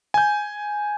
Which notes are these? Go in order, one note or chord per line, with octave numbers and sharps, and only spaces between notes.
G#5 G6